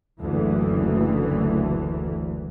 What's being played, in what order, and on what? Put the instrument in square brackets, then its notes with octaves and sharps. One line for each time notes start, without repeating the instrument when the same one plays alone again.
[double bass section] F#1 D2 E3